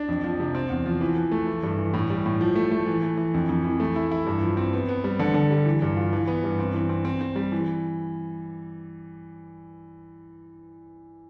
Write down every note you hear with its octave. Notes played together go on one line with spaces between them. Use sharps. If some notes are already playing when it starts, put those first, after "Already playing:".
Already playing: D4
F2
F3
C3
C4
E2
F3
E3
E3
A3
E3
G2
E3
A2
G3
A2
F3
A3
A3
E3
A3
E3
F2
F2
E3
A3
E4
E4
G2
F3
C4
B3
B3
G3
D3
D3
G3
E3
G2
F4
E3
B3
G2
C4
E3
C4
C4
C4
G3
E3